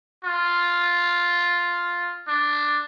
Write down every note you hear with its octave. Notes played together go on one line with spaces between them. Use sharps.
F4
D4